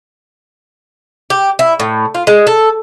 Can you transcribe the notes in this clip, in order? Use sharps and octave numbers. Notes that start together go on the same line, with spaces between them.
G4
E4
A2
F4
G#3
A4